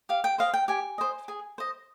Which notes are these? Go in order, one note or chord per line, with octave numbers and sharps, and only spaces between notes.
G4 F5
G5
C5 D#5 F5
G5
G4 G#5
C5 D#5
G#4
C5 D#5